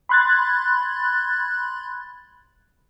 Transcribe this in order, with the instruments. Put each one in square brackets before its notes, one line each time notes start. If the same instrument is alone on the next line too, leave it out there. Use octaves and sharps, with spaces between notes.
[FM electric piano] B5 C6 F#6 G#6 A6